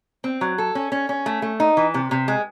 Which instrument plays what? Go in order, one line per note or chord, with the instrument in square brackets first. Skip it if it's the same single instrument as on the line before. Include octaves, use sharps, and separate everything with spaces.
[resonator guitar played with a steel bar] C4
F#3
A4
C#4
C#4
C#4
A3
A3
D#4
E3
C3
C3
G#3